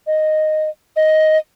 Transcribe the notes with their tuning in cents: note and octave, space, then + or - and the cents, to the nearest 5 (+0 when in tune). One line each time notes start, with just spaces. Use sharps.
D#5 -5
D#5 +5